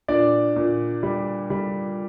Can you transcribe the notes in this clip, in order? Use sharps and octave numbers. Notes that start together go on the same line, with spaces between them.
A#2 D4 D5
A#2
G3
G3